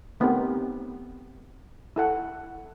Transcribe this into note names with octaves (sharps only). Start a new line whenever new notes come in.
A3 B3 C4 D#4 G4 A#4
E4 A4 F#5